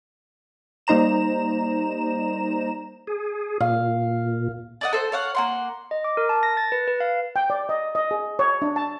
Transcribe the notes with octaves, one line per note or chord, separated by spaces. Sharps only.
G3 A#3 D#4 C5 A#5 E7
G#4
A#2 F5
D5 D#5 F#5
A4 C5
C#5 F5 F#5
A#3 F#5 C6
D#5
D6
A#4
A5
A#6
A6
B4
B4
F5
G5
D5
D#5
D#5
G#4
C#5
D4
A5